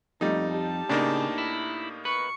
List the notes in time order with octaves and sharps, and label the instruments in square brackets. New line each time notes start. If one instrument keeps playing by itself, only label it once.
[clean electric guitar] F2 [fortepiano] G3 D#4 [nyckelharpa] A3
[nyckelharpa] G4 A5
[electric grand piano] A2 A#3 D#4 [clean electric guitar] C#3 [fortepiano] D4 D5
[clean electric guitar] E4
[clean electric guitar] B4 [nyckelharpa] C#6